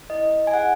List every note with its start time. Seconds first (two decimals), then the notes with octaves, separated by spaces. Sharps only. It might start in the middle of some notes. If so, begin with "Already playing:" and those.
0.10 E4 D#5
0.47 G#5
0.54 G#4 F#5